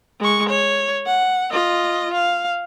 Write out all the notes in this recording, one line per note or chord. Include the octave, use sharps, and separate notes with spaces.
G#3 C#6
C#5
F#5
F4 D#5
F5